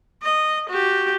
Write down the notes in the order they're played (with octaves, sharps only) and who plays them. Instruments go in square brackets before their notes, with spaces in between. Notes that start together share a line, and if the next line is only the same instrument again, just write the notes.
[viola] D#5
F#4 G4